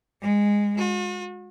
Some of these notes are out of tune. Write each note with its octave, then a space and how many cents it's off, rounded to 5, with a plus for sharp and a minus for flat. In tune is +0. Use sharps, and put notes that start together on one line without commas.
G#3 -15
F#4 -45